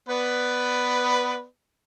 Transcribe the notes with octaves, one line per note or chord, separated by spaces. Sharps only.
B3 B4 D5